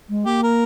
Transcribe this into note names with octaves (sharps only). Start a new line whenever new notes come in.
G#3
A#3 G4
A#4